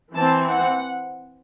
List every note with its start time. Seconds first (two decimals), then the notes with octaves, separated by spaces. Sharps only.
0.13 E3 C4 A5
0.49 F#5